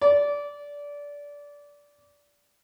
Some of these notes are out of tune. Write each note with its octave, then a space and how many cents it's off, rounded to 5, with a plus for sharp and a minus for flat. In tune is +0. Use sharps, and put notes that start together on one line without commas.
D5 -20